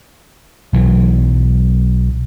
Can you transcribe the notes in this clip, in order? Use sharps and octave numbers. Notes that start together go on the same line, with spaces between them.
B1 E3 F#3